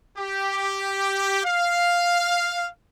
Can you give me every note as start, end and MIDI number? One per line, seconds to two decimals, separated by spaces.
0.17 1.43 67
1.44 2.68 77